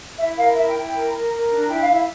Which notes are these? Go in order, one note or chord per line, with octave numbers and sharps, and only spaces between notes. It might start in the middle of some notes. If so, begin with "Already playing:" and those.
E4 E5
A#4 F5
E4 E5
G5
E4
G5
A#4
A#4
A#4
D4
E4 G5
F5
E4
F5